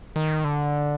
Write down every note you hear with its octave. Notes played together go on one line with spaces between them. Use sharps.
D#3
D3